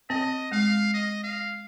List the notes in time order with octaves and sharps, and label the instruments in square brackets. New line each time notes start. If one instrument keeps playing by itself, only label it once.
[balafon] C4 [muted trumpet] D#5
[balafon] G#3 [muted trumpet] F5
[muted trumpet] D#5
F5